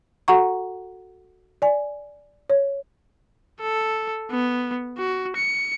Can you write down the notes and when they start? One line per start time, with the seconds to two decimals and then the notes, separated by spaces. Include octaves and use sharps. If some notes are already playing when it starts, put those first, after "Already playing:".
0.28 F#4 A4 F#5 A#5 C#6
1.62 D5 G#5
2.50 C#5
3.61 A4
4.31 B3
4.98 F#4
5.36 C#7